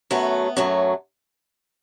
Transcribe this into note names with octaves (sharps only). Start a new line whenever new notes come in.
F#2 F#3 A3 B3
F#2 F#3 A3